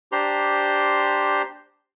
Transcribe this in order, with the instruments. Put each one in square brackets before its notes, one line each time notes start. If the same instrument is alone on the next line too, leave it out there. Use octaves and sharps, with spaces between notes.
[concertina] D4 G4 C5 A#5 C6